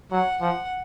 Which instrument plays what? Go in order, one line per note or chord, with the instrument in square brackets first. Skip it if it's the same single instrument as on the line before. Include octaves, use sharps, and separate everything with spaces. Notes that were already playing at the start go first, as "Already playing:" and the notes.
[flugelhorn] F#3 [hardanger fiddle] F#5
[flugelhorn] F3 [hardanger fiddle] F#5